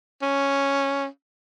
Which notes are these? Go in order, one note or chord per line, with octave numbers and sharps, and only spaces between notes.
C#4